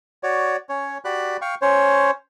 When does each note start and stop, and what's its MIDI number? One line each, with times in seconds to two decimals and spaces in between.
0.23 0.57 66
0.23 0.57 73
0.23 0.57 74
0.69 0.98 61
0.69 0.98 73
1.05 1.37 66
1.05 1.37 67
1.05 1.37 74
1.05 1.37 83
1.05 1.37 90
1.41 1.55 77
1.41 1.55 79
1.41 1.55 85
1.62 2.11 61
1.62 2.11 72
1.62 2.11 73